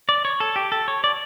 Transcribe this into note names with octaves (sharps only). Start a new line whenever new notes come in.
D5
C#5
A4
G4
A4
C#5
D5